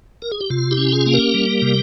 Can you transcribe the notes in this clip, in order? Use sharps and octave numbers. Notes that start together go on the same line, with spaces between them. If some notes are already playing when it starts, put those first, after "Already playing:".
A#4
G#4
G4
C3 F4
E4 G4
C#4
F4 G#4
A#3
G4 A#4
G3
C3